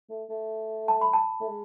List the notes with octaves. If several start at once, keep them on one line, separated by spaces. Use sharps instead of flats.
A3
A3
A5
B5
A5
A3
G#3